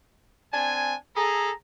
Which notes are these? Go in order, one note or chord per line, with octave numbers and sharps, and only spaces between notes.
C4 D4 G#5
G#4 A4 A#5